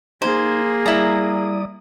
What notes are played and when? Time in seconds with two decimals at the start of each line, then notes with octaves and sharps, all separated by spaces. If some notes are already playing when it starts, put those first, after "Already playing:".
0.22 A#3 D#4 G#4 C5 G#6
0.86 G3 E4 D5 A#5 D#6